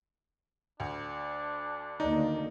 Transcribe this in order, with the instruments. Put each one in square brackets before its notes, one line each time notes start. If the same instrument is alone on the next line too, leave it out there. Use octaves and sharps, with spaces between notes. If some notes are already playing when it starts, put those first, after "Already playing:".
[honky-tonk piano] D2 [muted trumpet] D4
[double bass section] D2 D#3 A#3 [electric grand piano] D#4 [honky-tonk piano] D5